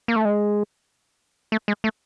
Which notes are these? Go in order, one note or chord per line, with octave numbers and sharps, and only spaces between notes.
A#3
A3
G#3
A3
G#3
A3